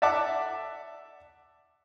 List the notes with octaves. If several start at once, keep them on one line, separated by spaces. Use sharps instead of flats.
D5 E5 F#5 A5 D6